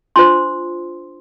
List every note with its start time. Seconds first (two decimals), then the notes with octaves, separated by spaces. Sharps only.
0.16 D4 F4 C5 C6